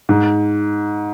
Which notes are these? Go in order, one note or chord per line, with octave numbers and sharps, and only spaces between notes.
G#2